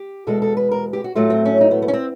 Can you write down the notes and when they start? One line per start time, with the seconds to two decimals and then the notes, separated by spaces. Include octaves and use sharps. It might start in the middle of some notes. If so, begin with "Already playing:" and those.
Already playing: G4
0.27 E2 B2 G#3 A4
0.42 A4
0.57 B4
0.71 A#4
0.93 G4
1.04 F#4
1.15 A2 F#3 A3 F4
1.30 C4
1.45 C#4
1.61 D#4
1.71 B3
1.82 B3
1.88 C#4
1.93 C4